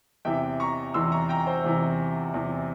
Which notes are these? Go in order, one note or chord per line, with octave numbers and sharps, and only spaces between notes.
E2 C3 E3 E5 G5
A#5 C#6
E2 C3 E3 C6 E6
A#5 C#6
G5 A#5
C5
E2 C3 E3
E2 C3 E3